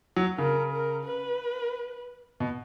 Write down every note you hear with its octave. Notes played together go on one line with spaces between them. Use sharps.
F#3
C#3 A#4
A#4
B4
B2